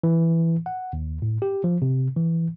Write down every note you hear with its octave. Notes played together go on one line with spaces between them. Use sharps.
E3
F#5
D#2
A2
G4
F3
C3
E3